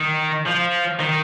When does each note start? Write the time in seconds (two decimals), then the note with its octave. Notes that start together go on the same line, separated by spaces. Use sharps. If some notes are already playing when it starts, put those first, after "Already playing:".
Already playing: D#3
0.46 F3
0.99 D#3